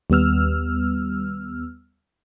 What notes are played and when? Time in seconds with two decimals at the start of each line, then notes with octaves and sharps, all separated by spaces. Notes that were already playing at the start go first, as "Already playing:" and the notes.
0.10 D#2 G3 B3 E6 F6